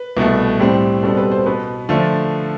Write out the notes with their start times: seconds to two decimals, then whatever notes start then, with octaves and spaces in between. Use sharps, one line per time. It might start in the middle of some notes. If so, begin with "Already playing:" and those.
Already playing: B4
0.17 C2 B2 A3
0.59 A2 G3 C4 G4
1.03 B2 G3 C4 A4
1.17 B4
1.32 C5
1.46 B2 B3 B4
1.89 D3 F3 A3